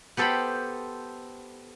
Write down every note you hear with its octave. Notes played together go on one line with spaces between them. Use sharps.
B3 G4 A4 C5 G5 B5